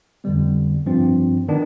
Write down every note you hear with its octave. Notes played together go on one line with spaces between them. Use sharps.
F2 D3 G3 B3
G2 F3 C4
D#3 B3 D4